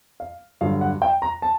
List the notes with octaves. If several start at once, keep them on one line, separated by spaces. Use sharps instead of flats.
F5
G2 D3 F#3 F5
F#5
G5
A#5
A5